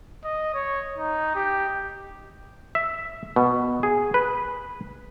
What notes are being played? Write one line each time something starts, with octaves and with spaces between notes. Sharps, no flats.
D#5
C#5
D#4
G4
E5
B2
G#4
B4